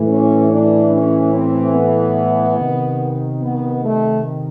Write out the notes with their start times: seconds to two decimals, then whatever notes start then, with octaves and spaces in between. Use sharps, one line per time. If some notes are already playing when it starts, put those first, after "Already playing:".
Already playing: A2 E3
0.08 C#4
0.50 D4
0.92 C#4
1.33 C4
1.74 B3
2.58 C3 D#3
3.41 B3
3.83 A3